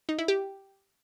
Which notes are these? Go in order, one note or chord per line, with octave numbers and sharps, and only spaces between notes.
D#4
E4
G4